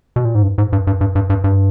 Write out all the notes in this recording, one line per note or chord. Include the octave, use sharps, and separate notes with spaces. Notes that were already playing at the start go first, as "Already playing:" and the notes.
B2
A#2
G#2
G2
G#2
G2
G2
G2
G2
G2
G2